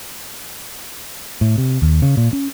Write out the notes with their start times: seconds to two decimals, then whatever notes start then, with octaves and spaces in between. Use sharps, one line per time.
1.41 A2
1.58 C3
1.82 D#2
2.02 C#3
2.17 A#2
2.33 C#4